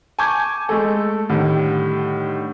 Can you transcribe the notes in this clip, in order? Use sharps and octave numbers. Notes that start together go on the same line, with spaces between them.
G#5 A5 C#6 D6 G6 G#6
G#3 A3 A4
A2 D3 D#3 G3